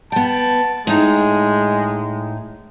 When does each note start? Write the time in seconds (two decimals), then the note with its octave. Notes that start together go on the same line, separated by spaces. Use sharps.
0.12 B3 G5 A5
0.87 A2 G#3 D#4